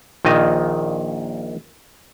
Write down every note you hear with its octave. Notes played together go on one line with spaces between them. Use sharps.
A#1 A#2 D#3 D#5